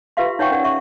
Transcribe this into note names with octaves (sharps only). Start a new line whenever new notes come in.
F4 G4 B4 E5 F5 C6
D#4 C#5 E5 F#5 G5 C#6
C#4 A#4 D5 F#5
E5 C#6